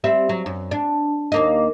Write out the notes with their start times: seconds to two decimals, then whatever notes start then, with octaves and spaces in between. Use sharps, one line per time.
0.04 G3 C4 E5
0.29 F#3
0.46 F#2
0.71 D4
1.32 D#2 A#3 D#5